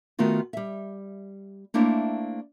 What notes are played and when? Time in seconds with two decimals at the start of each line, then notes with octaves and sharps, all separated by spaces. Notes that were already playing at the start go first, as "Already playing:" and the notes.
0.19 D#3 A3 B3 F4 F#4
0.53 G3 E5
1.74 A3 A#3 D4 E4 C5 C#5